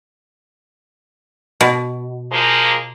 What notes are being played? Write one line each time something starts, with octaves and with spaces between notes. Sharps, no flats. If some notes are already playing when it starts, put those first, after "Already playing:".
B2
F3 G#3 A#3